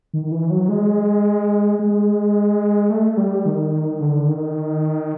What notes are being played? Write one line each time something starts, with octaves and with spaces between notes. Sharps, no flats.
D#3
E3
F#3
G#3
G#3
A3
G3
D#3
D3
D#3